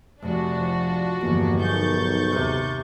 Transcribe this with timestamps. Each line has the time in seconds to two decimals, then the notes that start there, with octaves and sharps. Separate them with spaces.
0.22 F1 D4 F#4
0.59 F3
1.21 G1 E2 F3 A#3
1.60 B1 D#4 G#4 A#4 C#6 G6 A6
2.31 D#2 C3